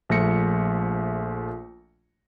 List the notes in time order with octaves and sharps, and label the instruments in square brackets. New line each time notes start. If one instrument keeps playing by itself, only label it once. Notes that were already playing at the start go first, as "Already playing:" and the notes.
[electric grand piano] A#1 F3 A3 A#6 C#7